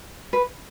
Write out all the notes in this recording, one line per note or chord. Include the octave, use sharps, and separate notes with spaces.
B4